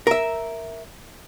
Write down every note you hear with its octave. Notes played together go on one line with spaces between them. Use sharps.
A#4 E5